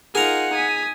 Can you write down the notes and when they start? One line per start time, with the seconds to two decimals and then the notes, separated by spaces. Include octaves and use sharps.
0.15 D#4 F4 G#4 A#4 F#5 A#5
0.54 G#5 D#6 B6